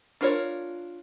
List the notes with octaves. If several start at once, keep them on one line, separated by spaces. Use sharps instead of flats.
D4 F4 A#4 C5 C#5